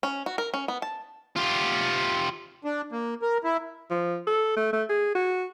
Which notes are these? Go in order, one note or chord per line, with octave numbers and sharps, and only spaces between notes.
C#4
F#4
A#4
C#4
B3
A5
F4 G4
D4
A#3
A#4
E4
F3
A4
A3
A3
G#4
F#4